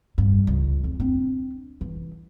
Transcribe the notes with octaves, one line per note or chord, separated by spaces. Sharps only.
G2
C#2
F2
C4 D4
E3